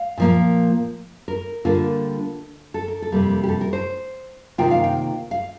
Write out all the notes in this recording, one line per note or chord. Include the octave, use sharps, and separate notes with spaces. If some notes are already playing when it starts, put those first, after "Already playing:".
Already playing: F5
A#2 F3 A#3
A#4
D3 G3 A#3 F4
A4
A#4
A4
F2 C3 G3 A#3
G4
A4
A#4
C5
C3 D#3 A#3 F4 G5
F5
G5
F5